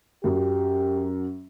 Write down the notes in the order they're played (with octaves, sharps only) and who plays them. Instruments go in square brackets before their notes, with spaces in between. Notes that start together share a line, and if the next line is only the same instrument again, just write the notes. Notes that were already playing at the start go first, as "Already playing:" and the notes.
[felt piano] F#2 F#3 [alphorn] G4